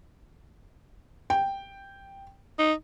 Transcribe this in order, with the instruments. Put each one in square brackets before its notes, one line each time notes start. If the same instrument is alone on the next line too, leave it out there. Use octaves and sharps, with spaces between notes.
[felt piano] G5
[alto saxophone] D#4